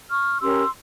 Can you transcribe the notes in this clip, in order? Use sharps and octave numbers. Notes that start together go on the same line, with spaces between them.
C#6 F6
C#4 G4 A#4 C6 E6